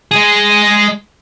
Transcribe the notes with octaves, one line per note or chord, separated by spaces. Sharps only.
G#3 G#4